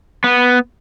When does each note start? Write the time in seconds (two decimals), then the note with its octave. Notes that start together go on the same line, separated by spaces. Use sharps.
0.24 B3